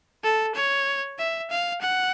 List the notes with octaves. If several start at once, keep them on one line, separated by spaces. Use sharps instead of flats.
A4
C#5
E5
F5
F#5